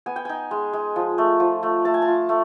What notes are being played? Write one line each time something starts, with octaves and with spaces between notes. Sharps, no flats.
B3 G#5
G5
D#4 G#5
G#3
G#3
F3
A3
F3
A3
A3 A5
G#5
A5
F4
A3